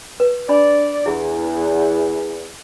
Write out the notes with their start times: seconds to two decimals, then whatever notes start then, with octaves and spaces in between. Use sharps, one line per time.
0.20 B4
0.49 D4 D5 B5
1.06 E2 E4 G#4